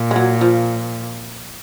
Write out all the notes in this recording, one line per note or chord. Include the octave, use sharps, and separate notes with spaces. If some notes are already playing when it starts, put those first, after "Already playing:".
Already playing: A#2
G#3
F#3
F3